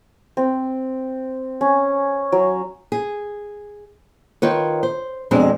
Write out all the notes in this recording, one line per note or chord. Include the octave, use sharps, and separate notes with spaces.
C4
C#4
F#3
G#4
D#3 F4 B4 C#5
C5
F2 B2 G#3 C4 D4